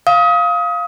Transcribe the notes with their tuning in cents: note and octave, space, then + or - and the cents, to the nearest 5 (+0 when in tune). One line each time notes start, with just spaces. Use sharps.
F5 +0 D#6 +30